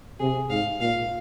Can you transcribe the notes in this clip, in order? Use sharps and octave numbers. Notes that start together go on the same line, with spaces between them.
C3 G#4
G#2 F5
A#2 F5